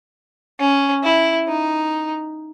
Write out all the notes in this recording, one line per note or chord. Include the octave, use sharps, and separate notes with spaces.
C#4
E4
D#4